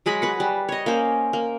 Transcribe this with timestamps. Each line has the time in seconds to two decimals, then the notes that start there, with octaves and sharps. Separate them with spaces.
0.06 F#3 G#3 G#4 B5
0.22 F#4 B4 F#5
0.40 G3
0.69 C#5 D#5
0.86 A#3 C#4 C5
1.33 A#3